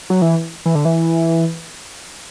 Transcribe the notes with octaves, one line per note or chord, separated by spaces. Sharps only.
F#3
E3
E3
D3
E3